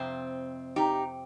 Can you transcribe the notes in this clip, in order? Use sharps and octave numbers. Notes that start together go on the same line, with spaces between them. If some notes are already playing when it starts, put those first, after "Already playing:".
Already playing: F2 C3 C4
D#4 G4